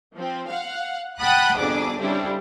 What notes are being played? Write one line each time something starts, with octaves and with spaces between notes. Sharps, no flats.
F3 C4
F5 F#5
F#5 G5 A5 B5 D#6 F#6
G1 F2 D4 G#4 A4 D6
C#3 G3 C4 D4 E4 A4